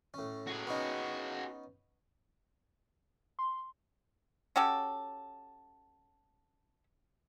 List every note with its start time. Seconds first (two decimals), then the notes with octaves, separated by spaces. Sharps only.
0.14 A2 C#4
0.47 F#4 G#4
0.67 B3 C#4 D#4
3.39 C6
4.56 C#4 F#4 G4 A4